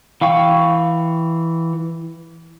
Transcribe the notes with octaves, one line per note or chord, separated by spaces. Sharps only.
E3 F5 G5 C#6